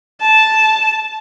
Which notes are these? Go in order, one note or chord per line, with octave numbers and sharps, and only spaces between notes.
A5